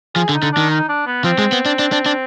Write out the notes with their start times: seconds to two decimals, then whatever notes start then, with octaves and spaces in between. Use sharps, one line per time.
0.15 F3 G#4
0.29 D3
0.34 D#4
0.43 D3
0.52 D#3 D4
0.70 D#4
0.89 D4
1.07 B3
1.24 F3 C4
1.39 G#3
1.52 B3
1.66 D4
1.79 D4
1.92 D4
2.06 D4